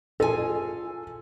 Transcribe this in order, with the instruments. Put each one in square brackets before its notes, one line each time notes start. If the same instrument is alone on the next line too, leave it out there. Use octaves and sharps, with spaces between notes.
[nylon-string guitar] F4 G#4 G#5 [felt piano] A4